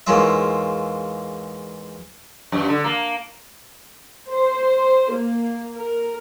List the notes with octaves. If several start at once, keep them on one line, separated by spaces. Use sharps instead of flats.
E2 G#2 A#3 C#4 F4 E5
F#2
D3
A#3
C5
A#3
A#4